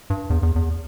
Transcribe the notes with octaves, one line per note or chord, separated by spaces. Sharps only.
G2
E2
E2
E2